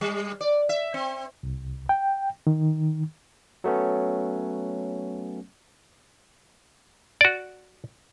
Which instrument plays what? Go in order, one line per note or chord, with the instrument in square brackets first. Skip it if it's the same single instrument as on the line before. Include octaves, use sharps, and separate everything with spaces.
[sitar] G3
D5
E5
C4
[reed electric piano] C2
G5
D#3
[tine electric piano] F#3 A3 B3 C#4
[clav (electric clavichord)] F#4 D5